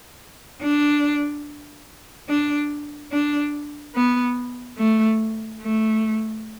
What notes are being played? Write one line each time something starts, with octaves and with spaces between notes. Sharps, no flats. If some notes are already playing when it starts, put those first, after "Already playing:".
D4
D4
D4
B3
A3
A3